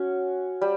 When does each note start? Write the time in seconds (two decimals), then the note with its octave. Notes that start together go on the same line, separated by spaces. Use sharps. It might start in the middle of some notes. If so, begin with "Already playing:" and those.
Already playing: C#4 F#4
0.61 G3